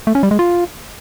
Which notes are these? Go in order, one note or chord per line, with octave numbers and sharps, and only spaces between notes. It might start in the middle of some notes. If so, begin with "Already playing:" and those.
A3
C#4
G3
G#3
F4